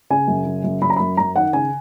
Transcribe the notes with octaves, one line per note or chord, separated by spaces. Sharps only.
C#3 G#5
F#2
C#3
F#2
F#2 B5
A#5
F#2 B5
F#2 A#5
D#3 F#5
C#3 G#5